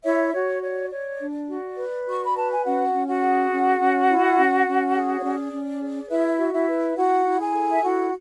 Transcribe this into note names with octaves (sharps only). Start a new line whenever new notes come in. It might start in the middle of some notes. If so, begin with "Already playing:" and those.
E4 C#5 E5
F#4 C#5
C#5 D5
C#5
D4
F#4
B4
F#4 C#6
B5
B4 A5
G#5
C#4 F#4 F#5
C#4
F#4 F#5
G#4
C#4
C#4
E4
C#4
C#4
G#4
C#5
C#4 D5
C#4
G#4
E4 B4 E5
F#4
E4 E5
B4
E4 F#4 F#5
E4
G#4 G#5
A4
E5
E4 F#4 F#5